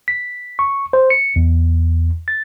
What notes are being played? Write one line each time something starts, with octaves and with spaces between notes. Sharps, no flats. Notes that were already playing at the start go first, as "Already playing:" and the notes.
B6
C#6
C5
C#7
E2
A6